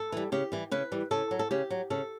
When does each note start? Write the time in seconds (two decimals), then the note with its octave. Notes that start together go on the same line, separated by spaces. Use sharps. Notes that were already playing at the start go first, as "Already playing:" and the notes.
Already playing: A4
0.12 E3 G3
0.32 C#3 G4
0.52 E3 G3
0.71 C#3 B4
0.92 E3 G3
1.11 C#3 A4
1.31 F#3
1.39 A4
1.51 C#3 G4
1.70 F#3
1.90 C#3 A4